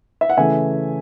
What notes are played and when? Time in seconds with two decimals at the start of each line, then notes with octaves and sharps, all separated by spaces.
0.21 E5
0.30 F#5
0.37 C#3 E3 A3 E5 G#5